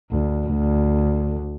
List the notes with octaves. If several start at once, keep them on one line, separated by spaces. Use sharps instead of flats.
D2
D2